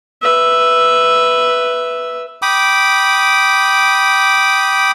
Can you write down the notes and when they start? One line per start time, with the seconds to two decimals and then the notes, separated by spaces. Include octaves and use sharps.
0.22 B4 E5
2.42 G5 B5 D6 D#6